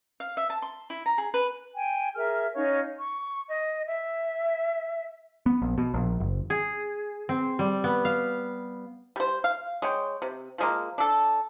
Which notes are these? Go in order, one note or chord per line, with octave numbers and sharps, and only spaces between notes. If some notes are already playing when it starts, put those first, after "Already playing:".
F5
E5
A5
C6
E4
A#5
G#4
B4
G5 G#5
G#4 A#4 E5 F6
C#4 D#4 C#5 F5
C#6
D#5
E5
B3
A#1
B2
A#1
F#1
G#4
C4
G3
B3
F5
G3 C5
F5
G#3 C#5 G5
C3
F3 G#3 A#3
D4 A4